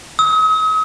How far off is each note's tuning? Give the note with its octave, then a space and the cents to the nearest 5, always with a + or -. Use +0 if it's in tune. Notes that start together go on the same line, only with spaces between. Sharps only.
D#6 +40